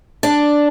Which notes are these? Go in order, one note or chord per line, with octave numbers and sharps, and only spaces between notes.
D4